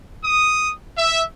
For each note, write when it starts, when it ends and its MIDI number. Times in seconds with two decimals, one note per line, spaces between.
0.24 0.71 87
0.97 1.23 76